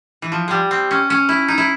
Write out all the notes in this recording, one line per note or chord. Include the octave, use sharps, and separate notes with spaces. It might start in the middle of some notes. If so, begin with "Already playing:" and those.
E3
F3
G3 G#3
C4
C#4
C#4
E4
D#4
E4